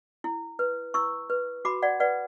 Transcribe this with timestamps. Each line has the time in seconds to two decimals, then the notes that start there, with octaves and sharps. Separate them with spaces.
0.24 E4
0.59 B4
0.94 E4 C#6 E6
1.30 B4
1.65 F#4 B5 D6
1.82 D5 F#5
2.00 B4 D5 F#5